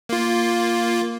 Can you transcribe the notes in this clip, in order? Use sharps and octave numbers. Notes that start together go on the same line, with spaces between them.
A#3 F4